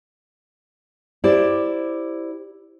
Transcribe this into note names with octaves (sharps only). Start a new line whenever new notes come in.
E4 G4 C5 D5